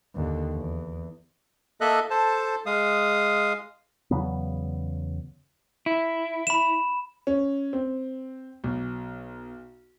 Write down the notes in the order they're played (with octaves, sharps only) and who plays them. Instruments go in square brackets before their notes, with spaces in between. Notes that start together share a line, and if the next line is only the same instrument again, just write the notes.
[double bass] D#2 D3
E2
[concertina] A#3 A4 D#5 E5 F#6
A4 C5 A5
G#3 F5 D#6
[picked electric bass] E2 C#3 F#3 B3
[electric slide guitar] E4
[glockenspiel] B5 E7
[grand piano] C#4
C4
B1